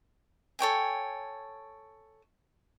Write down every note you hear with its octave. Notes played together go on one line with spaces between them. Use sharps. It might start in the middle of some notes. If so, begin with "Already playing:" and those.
A4 C#5 G5 G#5